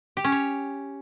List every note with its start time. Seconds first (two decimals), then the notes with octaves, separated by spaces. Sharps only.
0.17 G4
0.24 C#4
0.32 C#5